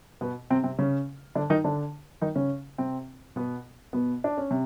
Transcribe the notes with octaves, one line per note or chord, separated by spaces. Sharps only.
B2 B3
C3 C4
C3 C4
C#3 C#4
D3 D4
D#3 D#4
D3 D4
D#3 D#4
C#3 C#4
C3 C4
B2 B3
B2 B3
D4
C#4
C3